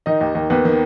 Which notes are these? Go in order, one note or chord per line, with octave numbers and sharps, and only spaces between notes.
D#3 D#4 D#5
D#2
D#2
D#2 B3 B4
D#3